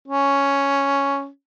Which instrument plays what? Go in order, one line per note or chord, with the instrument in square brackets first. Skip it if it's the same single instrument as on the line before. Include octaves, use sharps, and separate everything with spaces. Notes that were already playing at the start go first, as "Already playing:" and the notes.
[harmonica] C#4